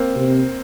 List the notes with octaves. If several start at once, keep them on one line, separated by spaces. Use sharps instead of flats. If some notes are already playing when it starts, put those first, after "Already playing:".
Already playing: A#3 C4
C3